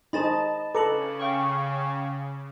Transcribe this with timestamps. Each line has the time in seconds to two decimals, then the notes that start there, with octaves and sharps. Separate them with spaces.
0.13 D#4 G#4 C5 D#5 A5 B5 A6 E7
0.75 C#3 A4 B4 A#5 D6 C#7 F#7
1.19 F5 G5 C#6